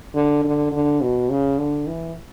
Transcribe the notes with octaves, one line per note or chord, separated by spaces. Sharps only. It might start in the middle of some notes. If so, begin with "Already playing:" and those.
D3
D3
D3
B2
C#3
D3
E3